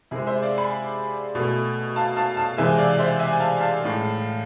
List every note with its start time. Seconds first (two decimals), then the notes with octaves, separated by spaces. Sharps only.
0.11 C3 G#3 E4 G#4
0.27 C5 E5
0.42 D5 F5
0.58 G#5 B5
1.35 B2 A3
1.96 F5 A5
2.17 F5 A5
2.37 F5 A5
2.57 C3 E3 G#3 E5 G#5
2.78 D5 F5
2.99 C5 E5
3.19 E5 G#5
3.33 G#5
3.40 F5 A5
3.60 F5 A5
3.81 A2 G#3